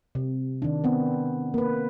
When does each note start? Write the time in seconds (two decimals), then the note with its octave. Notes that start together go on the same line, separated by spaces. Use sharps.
0.15 C3
0.62 D#3 D4
0.84 B3 C4
1.54 A#3 B4